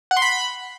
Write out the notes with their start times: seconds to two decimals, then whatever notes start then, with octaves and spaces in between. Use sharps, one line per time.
0.11 F#5
0.17 C6
0.22 B5